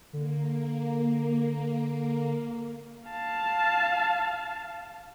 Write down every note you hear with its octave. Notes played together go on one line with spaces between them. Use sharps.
D3 A#3
F5 A5